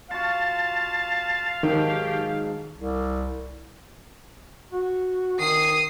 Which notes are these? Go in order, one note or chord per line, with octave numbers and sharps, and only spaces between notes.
F4 F#4 F5 A5
G#2 D#3 F#3 G4 A5
C2
F#4
D#3 D#6 C7